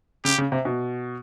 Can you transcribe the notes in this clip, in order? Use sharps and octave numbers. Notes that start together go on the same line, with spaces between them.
C#3 G4
C#3
C3
B2